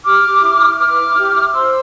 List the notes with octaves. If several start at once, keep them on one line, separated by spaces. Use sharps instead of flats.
G4 D6 F6
G4
E4
E4
B4 D6 F6
E4
G4
E4
C5 C6 E6